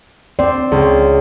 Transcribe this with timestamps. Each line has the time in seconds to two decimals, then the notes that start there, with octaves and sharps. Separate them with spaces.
0.39 C4 D5
0.72 C#2